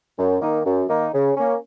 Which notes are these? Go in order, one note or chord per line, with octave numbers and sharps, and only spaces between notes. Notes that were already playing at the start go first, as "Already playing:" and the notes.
F#2
D#3 A#3 D#4
F#2
D#3 A#3 D#4
C#3
A#3 C#4